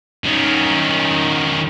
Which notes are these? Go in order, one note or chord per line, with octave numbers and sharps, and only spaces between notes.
D#3 C#4